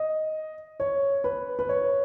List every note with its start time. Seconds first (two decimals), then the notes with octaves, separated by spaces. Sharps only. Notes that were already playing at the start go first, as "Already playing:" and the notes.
Already playing: D#5
0.80 C#5
1.24 B4
1.59 B4
1.69 C#5